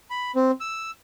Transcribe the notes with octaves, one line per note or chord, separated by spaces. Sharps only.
B5
C4
E6